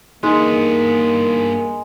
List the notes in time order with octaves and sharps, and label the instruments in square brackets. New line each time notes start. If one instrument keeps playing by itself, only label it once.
[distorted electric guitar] G2 B3 [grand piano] E3 D#4 [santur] G#3 [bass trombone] A#3